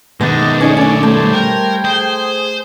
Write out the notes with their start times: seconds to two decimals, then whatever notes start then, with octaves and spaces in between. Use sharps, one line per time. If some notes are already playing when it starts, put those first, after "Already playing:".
0.21 B2 D#3 G#3 B3 D4 D#4 D#5
0.61 A3 C#4 D#4 G#4 C#5 D5
0.77 C#4 D4 D5
1.03 G3 A3 C5 C#5
1.33 A#4 G5
1.85 G#4 C5